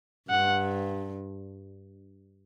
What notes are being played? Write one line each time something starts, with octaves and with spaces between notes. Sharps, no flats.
G2 F#5